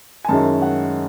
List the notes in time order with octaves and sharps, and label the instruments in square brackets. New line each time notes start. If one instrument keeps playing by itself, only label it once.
[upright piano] G#5
F#2 D#3 G#3 C#4 E4 A5
F#5